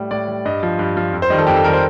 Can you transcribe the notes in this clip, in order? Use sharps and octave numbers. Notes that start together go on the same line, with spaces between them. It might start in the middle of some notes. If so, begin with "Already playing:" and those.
Already playing: A2 G3
A2 D5
G3
G2 D#5
F3
G2
F3
F2
C5
D#3 G3 D#5
A4
F2 G4
A4
D#3 G3 A#4
C5